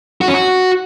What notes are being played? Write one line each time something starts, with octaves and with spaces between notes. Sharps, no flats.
F#4
C#4
F#4